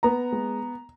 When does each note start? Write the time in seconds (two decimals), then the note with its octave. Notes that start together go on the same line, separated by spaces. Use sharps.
0.03 B3 A#5
0.32 G#3